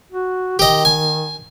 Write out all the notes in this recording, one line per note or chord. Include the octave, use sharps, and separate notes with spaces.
F#4
D#3 G4 D#5
G#5